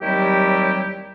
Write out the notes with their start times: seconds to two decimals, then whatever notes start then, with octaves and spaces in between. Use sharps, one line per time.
0.01 D#2 F#3 G3 C4 E4 G4